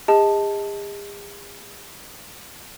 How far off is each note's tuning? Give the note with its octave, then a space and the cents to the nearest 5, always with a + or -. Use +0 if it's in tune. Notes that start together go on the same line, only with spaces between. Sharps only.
G#4 -45 D#5 +25 A5 +0